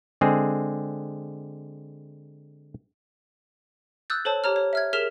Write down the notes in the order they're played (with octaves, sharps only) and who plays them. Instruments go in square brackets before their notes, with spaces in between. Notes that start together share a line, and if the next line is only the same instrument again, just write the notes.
[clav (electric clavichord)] D3 G#3 C4 G#4
[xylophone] D#6 E6 F#6 G6 A6
A4 C5 C#5 A5
G4 C#5 A#5 F6
C#5
E5 F6 G#6
G#4 A#4 F6 B6 E7 F7